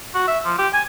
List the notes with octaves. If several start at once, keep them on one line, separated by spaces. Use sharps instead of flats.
F#4
E5
F3
G4
G#5